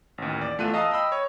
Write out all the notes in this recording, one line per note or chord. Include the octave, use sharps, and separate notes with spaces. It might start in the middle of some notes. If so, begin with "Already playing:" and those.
A1 D#2
D5
E2 A3 F4 A4 F#6 D#7
D#5 F5 A5 A#5 D#6 E6
D#5 G5 B5 E6
C#5